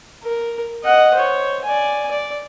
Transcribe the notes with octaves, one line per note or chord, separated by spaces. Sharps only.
A#4
D#5 F#5
C5 C#5
D5 G#5
D5